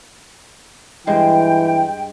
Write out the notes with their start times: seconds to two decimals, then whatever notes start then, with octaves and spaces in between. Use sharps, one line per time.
1.07 G2 E3 G#3 C5 G5